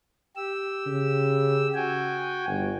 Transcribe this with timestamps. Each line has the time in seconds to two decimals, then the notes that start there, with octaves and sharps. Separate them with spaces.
0.36 G4 E6
0.86 C#3
1.74 F#4 G5 G#5
2.47 G1